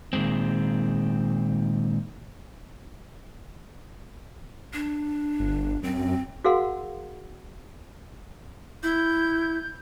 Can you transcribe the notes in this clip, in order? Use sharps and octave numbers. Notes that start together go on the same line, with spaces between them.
A#2 D#3 F3 G#3 C4
D4
G1
F#2 C4
F#4 G#4 A#4 F5 F#5 C6
E4 G6